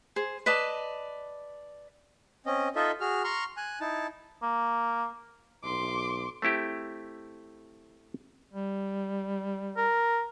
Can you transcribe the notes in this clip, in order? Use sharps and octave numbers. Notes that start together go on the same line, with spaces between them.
G#4 C5
B4 D5 D#5 A5
C4 C#4 D#5
D#4 F4 A4 D#5 E5
F#4 G#4 F6
A#5 C6 C#6 F6
G#5 F#6
D#4 E4 A5
A#3
B1 C6 D6
A3 C4 E4 G4
G3
A#4